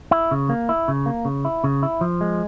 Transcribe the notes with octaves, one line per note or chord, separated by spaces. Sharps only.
E4
C#3
A#3
E4
C#3
A#3
C#3
E4
C#3
E4
F3
G#3